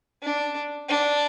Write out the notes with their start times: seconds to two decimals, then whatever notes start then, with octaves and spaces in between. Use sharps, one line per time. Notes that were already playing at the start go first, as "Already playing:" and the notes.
0.22 D4
0.89 D4